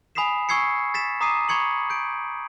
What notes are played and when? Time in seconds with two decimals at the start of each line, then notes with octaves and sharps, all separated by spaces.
0.15 G#5 B5 D#6 B6 C7 E7
0.49 G#5 C#6 E6 G#6 C7 C#7
0.94 A6 B6 E7
1.21 A#5 D6 D#6 B6 C7 D#7
1.49 B5 C#6 G#6 C#7 F#7
1.90 G6 D7